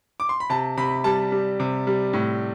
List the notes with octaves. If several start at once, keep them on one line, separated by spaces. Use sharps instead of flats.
D6
C6
B5
C3 A5
C3 B5
G3 A5
G3
C3
G3
A2